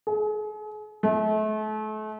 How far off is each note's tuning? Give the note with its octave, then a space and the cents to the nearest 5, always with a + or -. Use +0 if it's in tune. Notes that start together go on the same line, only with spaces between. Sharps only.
G#4 +40
A3 -35